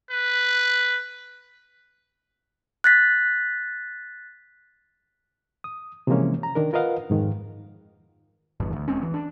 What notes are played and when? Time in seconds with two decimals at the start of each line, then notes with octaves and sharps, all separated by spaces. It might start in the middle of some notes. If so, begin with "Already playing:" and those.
0.11 B4
2.84 F#6 A6 B6
5.64 D#6
6.07 C3 E3 F3 G#3 A#3 C#4
6.43 A#5
6.55 D#3 D4 A#4
6.73 F4 A#4 B4 D#5 F5 F#5
7.10 F2 G#2 D#3
8.60 D1 G#1 E2 G2
8.73 D2
8.88 E1 G#3 C4 C#4
9.02 E3
9.14 D4